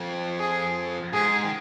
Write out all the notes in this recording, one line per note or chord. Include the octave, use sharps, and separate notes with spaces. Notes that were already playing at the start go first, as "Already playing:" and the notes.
Already playing: F2
G#4
G#2 G#4
D#3